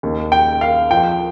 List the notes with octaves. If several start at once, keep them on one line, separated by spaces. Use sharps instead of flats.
D#2 D#3
G5
F5
F2 F3 G5